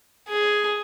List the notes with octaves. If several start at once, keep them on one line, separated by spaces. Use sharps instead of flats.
G#4